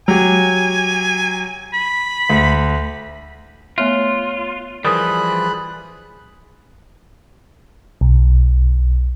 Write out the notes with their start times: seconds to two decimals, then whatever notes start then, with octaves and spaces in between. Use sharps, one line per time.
0.08 F#3 G4 G#5
1.74 B5
2.30 D2
3.78 A3 B3 F4 C#5 E5 F6 F#6
4.85 E3 F3 G3 G#4 A#4 B5 D#6 F#6
8.01 B1